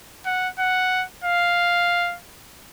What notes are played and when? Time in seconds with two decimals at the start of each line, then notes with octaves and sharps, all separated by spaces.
0.26 F#5
0.59 F#5
1.24 F5